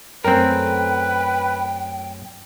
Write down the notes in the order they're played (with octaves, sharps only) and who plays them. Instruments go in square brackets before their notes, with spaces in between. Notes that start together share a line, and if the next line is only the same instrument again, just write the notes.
[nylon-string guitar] F#2 A3 [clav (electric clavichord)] C4 A#4 [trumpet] B4 [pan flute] G5